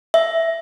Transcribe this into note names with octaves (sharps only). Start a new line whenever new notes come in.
E5